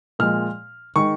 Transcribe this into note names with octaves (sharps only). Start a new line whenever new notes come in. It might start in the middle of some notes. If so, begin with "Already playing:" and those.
A#2 F3 G#3 F6
D#3 G#3 C#6